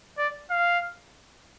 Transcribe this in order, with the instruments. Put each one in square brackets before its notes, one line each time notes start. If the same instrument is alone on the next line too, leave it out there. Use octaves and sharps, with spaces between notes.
[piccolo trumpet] D5
F5